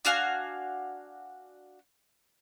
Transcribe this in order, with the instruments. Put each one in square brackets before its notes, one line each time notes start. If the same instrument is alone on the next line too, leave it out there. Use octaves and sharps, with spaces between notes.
[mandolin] D4 F#4 F5 G#5